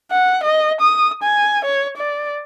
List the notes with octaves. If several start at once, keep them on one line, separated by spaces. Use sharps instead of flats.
F#5
D#5
D#6
G#5
C#5
D5